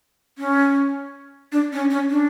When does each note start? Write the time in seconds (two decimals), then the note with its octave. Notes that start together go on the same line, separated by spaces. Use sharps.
0.38 C#4
1.52 D4
1.73 C#4
1.90 C#4
2.11 D4